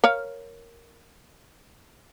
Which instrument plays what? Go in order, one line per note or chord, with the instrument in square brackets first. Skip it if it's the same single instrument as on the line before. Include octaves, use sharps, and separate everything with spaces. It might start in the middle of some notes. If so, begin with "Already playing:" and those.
[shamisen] A#4 C#5 F5